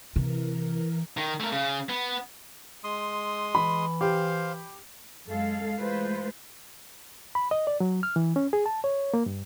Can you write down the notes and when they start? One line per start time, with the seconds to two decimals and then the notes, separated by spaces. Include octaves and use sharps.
0.16 C3 E3 A#4
1.17 D#3
1.40 A3 A#4
1.52 C#3
1.89 B3
2.84 G#3 C6 D#6
3.55 E3 B5
4.01 G4 C5 F5
5.26 F#2 G#3 A4 F5
5.78 E3 G#3 A3 F4 B4 C5
7.35 B5
7.51 D#5
7.67 D5
7.80 F#3
8.03 F6
8.16 E3
8.36 C#4
8.53 G#4
8.66 A5
8.84 C#5
9.14 A#3
9.26 G2